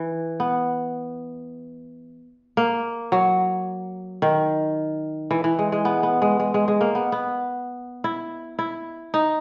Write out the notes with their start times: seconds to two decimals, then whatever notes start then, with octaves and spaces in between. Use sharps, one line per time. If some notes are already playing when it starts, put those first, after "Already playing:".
Already playing: E3
0.40 B3
2.57 A#3
3.12 F#3
4.22 D#3
5.31 E3
5.44 E3
5.59 G#3
5.72 G#3
5.85 B3
6.03 B3
6.22 G#3
6.40 G#3
6.54 G#3
6.68 G#3
6.81 A#3
6.95 B3
7.12 B3
8.04 E4
8.59 E4
9.14 D#4